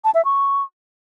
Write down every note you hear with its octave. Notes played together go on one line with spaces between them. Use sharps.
A5
E5
C#6